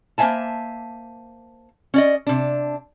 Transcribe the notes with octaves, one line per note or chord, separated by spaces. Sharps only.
A#3 C5 D5 E5 G#5 A5
C#4 D5 D#5
C3 D4